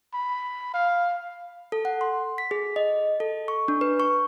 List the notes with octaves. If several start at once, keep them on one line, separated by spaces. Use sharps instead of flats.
B5
F5
A4
F#5
C6
B6
G#4
D#5
A4
C#6
D4
B4
C#6